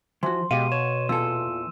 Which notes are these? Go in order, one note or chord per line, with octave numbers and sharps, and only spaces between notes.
E3 F3 F#4 C6
B2 G#3 G4 F5 D#7
C#5 E7
E2 A#2 F4 A4 E6